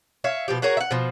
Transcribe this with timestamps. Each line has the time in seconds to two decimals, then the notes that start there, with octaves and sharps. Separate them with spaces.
0.24 C#5 E5 F5
0.48 B2 F3 G4
0.62 F#4 G#4 A#4 C#5
0.77 E5 F#5
0.91 B2 F3